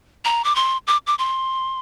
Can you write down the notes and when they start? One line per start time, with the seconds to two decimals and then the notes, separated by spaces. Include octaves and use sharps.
0.25 A#5
0.44 D6
0.56 C6
0.87 D6
1.07 D6
1.19 C6